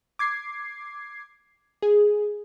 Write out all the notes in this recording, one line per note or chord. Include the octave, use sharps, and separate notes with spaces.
D6 G#6 C7
G#4